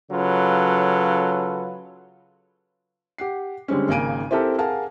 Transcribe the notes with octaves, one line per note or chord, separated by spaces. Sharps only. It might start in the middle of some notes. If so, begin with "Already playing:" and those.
C#3 F#3 F4 A4 B4
G4 F#5 C7
D3 G3 G#3 C4 C#4
G#1 C#3 A#3 G#5 D7 D#7
C4 E4 G4 A4 A#4
G#4 A#4 F5 F#5 G#5 A5